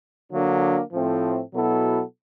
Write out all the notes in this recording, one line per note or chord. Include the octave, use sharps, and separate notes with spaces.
D3 F#3 A#3 D4
A2 F3 A3 C4
B2 F#3 B3 E4 A4